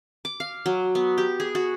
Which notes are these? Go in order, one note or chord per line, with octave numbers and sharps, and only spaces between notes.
D6
F5
F#3
B3
G4
G#4
F#4